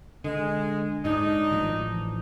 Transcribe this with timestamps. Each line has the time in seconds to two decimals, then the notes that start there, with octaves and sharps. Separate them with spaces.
0.24 D3 G#3
1.05 G#2 D4 D#4
1.52 A1 E3 F3